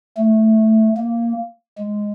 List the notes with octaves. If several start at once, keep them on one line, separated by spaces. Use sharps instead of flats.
A3
A#3
G#3